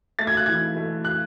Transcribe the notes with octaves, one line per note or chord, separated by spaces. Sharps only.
A3 A6
G#6
F#6
E3 G#6
A3
F#6